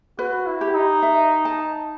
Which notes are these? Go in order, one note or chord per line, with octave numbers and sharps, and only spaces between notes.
F#4 B4
E4
G4
D#4
E5
A5